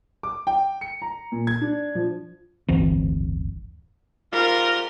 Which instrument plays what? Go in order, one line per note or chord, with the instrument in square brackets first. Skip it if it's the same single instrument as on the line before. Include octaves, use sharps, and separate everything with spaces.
[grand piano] D6
G5
C#7
A#5
A#2
G#6
D4
F3
[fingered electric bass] D1 G1 E3 C4
[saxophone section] G#2 G3 F4 [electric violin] A#4